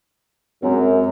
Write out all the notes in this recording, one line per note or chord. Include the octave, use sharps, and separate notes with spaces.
F#2 G#3 C4 C#4